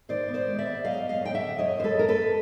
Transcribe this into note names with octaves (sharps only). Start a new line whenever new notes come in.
D#3 C5 D5
B3
C5 D5
G#3
D5 E5
B3
F#3 D#5 F5
F#2
D#5 F5
F#3 G5
E5 F#5
D3
F#2 C#5 D#5
F#2 C5
A4 B4
F#2 A#4
A4 B4
F#2